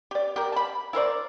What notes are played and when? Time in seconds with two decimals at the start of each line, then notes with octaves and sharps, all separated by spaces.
0.11 G4 D5
0.36 G4 A#4
0.52 A5 B5
0.93 E4 A#4 C5 D5